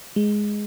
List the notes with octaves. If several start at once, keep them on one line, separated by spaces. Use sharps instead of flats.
G#3